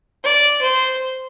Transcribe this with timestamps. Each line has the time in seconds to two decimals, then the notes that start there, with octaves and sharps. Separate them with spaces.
0.24 D5
0.62 C5